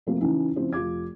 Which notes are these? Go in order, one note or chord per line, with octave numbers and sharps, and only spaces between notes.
C3 F3 A3 A#3 C4
C#3 E3 C#4 D#4 E4
C#3 F3 C4 E4
F1 F4 D6 G#6